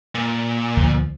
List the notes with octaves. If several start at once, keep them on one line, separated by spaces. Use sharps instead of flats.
A#2
D2 F3